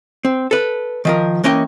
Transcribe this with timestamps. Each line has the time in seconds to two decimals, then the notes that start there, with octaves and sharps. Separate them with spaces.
0.25 C4
0.51 A4 B4
1.05 D#3 F3 A#4
1.44 E3 A#3 C#4 D#5 G5